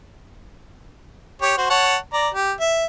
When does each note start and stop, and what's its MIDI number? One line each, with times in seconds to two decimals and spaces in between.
1.42 1.54 67
1.42 1.54 73
1.57 1.67 66
1.57 1.67 72
1.70 1.96 73
1.70 1.96 78
1.70 1.96 81
2.13 2.29 74
2.13 2.29 82
2.34 2.52 67
2.60 2.85 76